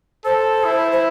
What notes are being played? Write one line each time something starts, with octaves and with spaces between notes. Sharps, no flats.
A4 C5
E4
C5